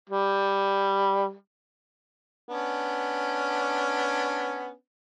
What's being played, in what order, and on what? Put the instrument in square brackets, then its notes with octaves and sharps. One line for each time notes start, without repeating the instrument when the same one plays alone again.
[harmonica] G3
B3 C#4 D4